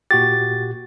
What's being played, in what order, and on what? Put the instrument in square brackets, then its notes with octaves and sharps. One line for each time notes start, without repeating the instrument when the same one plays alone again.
[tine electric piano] A#2 F#4 G4 [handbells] A6